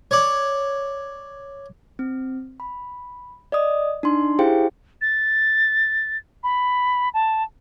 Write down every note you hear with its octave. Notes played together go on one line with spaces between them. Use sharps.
C#5 D5
C4
B5
D5 D#5 D#6
D4 D#4 C6
E4 G4 G#4 C5 F5 G5
A6
B5
A5